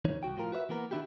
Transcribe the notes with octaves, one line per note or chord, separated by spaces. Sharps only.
D#2 E3 D#4 C#5
C2 F2 F#4 G5
A2 F3 F4 A#4
F#4 B4 C#5 E5
E3 A#3 B3 A#4
D#3 G#3 D4 E4 F#4 G4